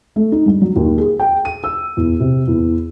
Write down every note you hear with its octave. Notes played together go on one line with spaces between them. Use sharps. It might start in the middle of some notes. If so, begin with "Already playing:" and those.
A3
D#4
G2
F#3
D#2
G#4
G5
D#7
E6
E2
C3
E2